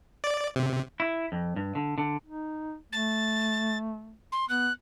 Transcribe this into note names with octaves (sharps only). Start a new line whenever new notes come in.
D5
C3
E4
F2
G2
D3
D3
D#4
A3 A6
C6
B3 F#6